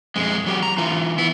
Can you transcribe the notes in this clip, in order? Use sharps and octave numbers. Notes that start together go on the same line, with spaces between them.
F2 G#3
F#3 G4
A#5
E3 F4
B3 E4